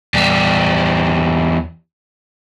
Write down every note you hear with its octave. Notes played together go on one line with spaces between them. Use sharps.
E2 G3